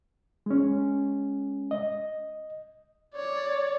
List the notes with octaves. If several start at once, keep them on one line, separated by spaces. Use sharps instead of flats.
G#3 C#4
D#5
C#5 D5